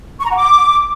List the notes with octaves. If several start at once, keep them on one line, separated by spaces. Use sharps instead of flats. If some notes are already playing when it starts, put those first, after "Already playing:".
C#6
A#5
F#5
D6